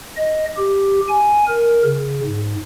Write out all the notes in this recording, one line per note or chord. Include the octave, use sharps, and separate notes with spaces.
D#5
G4
G#5
A#4
C#3
G#2